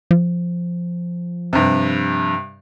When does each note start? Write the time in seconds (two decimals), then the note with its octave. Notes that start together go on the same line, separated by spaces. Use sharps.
0.11 F3
1.53 G2 C3